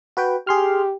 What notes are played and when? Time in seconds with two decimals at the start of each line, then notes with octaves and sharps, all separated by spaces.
0.17 F#4 B4 G5
0.47 G4 G#4 C6 F6